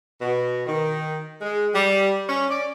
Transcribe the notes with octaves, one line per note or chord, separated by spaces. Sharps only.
B2
D#3
G#3
G3
C#4
D5